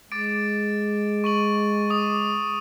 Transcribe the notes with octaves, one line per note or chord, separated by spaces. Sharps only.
G#3 D6 A6 D7
C#6 D#7 F#7
D6 D#6 D#7